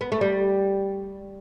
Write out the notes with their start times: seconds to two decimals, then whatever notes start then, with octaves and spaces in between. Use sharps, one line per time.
0.01 B3
0.12 A3
0.21 G3